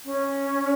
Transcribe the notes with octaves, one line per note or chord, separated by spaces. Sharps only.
C#4